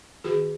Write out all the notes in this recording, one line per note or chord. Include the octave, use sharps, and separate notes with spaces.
D#3 F#4 G#4